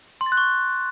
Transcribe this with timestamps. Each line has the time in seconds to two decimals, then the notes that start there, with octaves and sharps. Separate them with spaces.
0.21 C6
0.26 A6
0.32 F#6
0.37 C#6